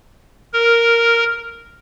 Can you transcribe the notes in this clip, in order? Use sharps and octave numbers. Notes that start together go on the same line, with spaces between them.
A#4